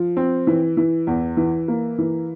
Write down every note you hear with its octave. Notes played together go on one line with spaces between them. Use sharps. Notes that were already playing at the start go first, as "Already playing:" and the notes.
Already playing: F3
C4
E3
E3
E2
E3
A#3
E3